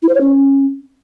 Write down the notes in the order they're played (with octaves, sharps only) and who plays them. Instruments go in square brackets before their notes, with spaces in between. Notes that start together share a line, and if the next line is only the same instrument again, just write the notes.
[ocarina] E4
C5
C#5
C#4